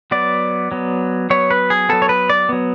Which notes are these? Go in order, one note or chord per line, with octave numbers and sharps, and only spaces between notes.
F#3 B3 D5
F#3 B3
F#3 B3 C#5
B4
G#4
F#3 B3 A4
C#5
B4
D5
F#3 B3